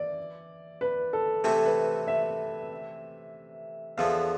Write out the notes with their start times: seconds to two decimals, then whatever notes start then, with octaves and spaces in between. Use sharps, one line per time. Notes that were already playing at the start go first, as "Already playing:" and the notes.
Already playing: E3 D5
0.81 B4
1.13 A4
1.44 C3 E3 A3 C4 E4 A4
1.65 B4
2.08 E5
3.97 E2 D3 F3 B3 F5